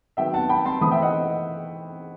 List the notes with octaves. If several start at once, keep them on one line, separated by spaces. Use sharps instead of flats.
D#3 F#3 B3 E5 G5
F#5 A5
G5 B5
A5 C6
E3 A3 C4 B5 D#6
E5 G5
D#5 F#5